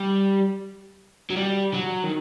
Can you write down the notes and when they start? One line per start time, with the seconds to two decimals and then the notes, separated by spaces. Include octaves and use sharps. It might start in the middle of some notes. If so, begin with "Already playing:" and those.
Already playing: G3
1.30 F#3
1.36 G3
1.74 F#3
2.03 D#3